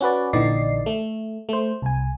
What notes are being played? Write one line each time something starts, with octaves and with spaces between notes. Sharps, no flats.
C#4 F#4 B4 D5
A#1 D3 E3 D#4 D5 C7
A3
A3 C5
C2 G#5